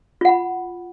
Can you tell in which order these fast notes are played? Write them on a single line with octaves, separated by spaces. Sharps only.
F4 F#5 B5